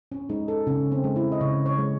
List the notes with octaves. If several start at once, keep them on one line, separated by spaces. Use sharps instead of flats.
C#4
G#3 D#4
A4
C#3 C#4
C4
G#3
E4
D#5
C#3 C#5
C#5
G#3